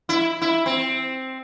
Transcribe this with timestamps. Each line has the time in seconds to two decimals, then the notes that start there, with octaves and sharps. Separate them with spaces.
0.09 E4
0.42 E4
0.66 C4